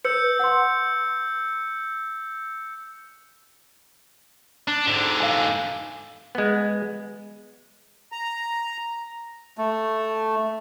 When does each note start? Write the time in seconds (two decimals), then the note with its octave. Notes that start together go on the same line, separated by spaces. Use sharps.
0.05 B4 E6 G6 C#7
0.39 F#5 C6
4.68 D4
4.87 G#2 D3
5.20 F5 G#5
6.35 G#3 B3
8.12 A#5
9.58 A3